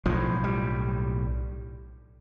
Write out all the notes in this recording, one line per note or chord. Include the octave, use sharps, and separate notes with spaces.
B1 A2 F3
G3